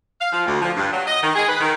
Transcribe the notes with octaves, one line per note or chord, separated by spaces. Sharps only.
F5
F3
D2
F3
G2
F#3
D#5
D#3
G#4
B4
D#3